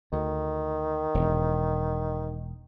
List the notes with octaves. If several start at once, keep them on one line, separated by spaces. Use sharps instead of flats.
D2 D#3
E1